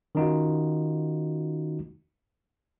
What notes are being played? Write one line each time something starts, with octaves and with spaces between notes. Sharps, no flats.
D#3 C#4 D#4 F4 F#4